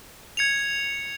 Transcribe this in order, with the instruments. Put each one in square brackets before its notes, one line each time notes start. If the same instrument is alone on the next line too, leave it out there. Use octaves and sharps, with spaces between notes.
[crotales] G#6 C#7 F7